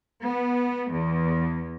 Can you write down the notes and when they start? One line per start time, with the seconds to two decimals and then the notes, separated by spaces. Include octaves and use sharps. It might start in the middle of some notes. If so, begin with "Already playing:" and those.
0.21 B3
0.92 E2